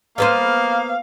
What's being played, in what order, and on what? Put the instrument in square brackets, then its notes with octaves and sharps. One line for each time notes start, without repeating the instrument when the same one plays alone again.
[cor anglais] A#3 [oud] B3 B4 C5 [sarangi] F5